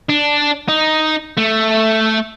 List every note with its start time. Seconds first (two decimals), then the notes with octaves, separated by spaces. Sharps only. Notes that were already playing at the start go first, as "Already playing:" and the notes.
0.09 D4
0.68 D#4
1.37 A3